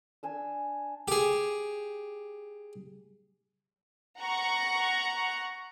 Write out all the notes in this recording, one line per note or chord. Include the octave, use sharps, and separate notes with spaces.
D4 G#5 E6
G4 G#4
F#5 A#5 C#6